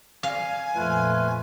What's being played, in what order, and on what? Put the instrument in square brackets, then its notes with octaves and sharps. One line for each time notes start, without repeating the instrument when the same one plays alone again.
[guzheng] F5 [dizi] G#5
[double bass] F2 A#2 [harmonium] A3 F4 B4